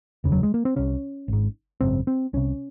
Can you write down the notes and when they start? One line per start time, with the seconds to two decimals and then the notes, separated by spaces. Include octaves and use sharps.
0.24 F1 D#2 C#3
0.32 F#3
0.43 G#3
0.54 A#3
0.65 C4
0.76 C2 C3 C#4
1.28 G#1 G#2
1.80 G#1 F#2 C#3 C4
2.07 C4
2.33 C2 C3 C#4